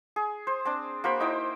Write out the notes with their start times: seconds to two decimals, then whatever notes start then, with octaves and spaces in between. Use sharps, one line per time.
0.16 G#4
0.47 C5
0.65 C4 D4
1.04 A#3 F#4 C5 B5
1.20 D#4 E4 C5 G5